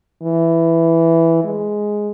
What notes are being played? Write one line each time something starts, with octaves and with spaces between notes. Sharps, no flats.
E3
G#3